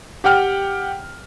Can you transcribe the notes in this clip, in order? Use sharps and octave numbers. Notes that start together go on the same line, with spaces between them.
G4 F#5 G5 F6